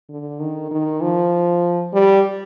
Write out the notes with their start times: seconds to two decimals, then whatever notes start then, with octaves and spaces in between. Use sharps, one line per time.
0.09 D3
0.40 D#3
0.71 D#3
1.01 F3
1.93 G3